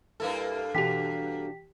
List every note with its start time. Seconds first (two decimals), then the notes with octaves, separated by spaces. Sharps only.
0.20 G2 A#3 E4 A4 B4
0.75 B2 E3 D4 F#4 G4 G5 B6